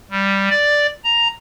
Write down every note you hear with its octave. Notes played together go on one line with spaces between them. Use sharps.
G3
D5
A#5